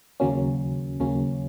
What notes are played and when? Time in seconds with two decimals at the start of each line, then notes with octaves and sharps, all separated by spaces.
0.20 D#2 C#3 F#3 A#3 C#4
1.00 D#2 C#3 F#3 A#3 C#4